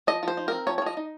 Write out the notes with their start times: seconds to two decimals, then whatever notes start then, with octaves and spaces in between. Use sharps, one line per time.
0.07 F3 D#5
0.23 F3 C5
0.37 D#4
0.48 C4 A#4
0.67 F3 C#5
0.78 C#5
0.82 F3 D#5
0.97 D#4